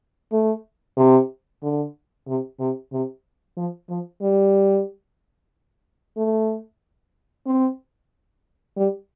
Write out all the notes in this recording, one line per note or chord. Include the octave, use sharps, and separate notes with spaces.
A3
C3
D3
C3
C3
C3
F3
F3
G3
A3
C4
G3